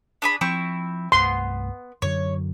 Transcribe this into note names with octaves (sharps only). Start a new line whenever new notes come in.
D4 G#4 B5
F3 C4 E4 C#6
C2 G2 A3 B3 C6
F#2 D3 F#3 C#5